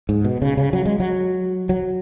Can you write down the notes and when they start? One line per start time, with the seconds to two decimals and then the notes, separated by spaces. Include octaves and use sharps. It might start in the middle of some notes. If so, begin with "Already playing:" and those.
0.09 G#2
0.24 B2
0.42 C#3
0.57 C#3
0.73 F#3
0.85 G#3
1.00 F#3
1.69 F#3